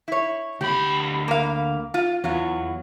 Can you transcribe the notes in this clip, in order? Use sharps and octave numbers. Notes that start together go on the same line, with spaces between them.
E4 C#5
D2 G4 B5
A#3 F5
F4
E2 F#3 F4